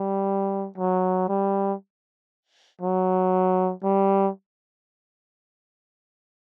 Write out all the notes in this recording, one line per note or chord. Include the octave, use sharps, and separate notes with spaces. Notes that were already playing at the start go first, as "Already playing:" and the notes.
Already playing: G3
F#3
G3
F#3
G3